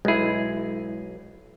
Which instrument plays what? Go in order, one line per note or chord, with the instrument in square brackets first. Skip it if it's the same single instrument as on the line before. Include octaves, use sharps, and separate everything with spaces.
[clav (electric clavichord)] B1 G#4 [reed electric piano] G#3 E4